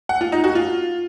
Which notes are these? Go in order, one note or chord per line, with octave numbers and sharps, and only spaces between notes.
F#5
F4
D#4
F#4
F4